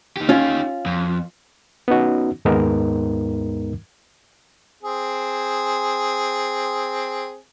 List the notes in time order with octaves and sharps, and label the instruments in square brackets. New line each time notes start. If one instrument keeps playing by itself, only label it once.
[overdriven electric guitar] D#4 G4
[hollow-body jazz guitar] C#4 F4
[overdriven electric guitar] F2
[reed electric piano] B3 C#4 D#4 F#4
D#2 G#2 G#3 B3 D#4 A#4
[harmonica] C4 G#4